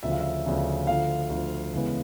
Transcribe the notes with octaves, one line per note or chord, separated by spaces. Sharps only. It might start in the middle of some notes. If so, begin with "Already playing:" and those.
D2 C#3 F3 E5
F5
E5
D2 C#3 F3
D2 D3 F3 F5
D2 D3 F3
E2 C#3 E3 G#3 B3